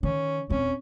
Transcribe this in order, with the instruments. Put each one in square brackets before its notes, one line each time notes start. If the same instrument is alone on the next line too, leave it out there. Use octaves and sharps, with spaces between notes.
[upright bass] D#3 [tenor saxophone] C#4
[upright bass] D#1 C4 [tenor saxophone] C#4